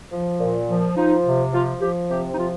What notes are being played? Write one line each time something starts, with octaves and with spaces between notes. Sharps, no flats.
F3
A#2
F3
F3 D#4
C3
F3 F4
F3 G4
C3 G4
D#4
F3 F4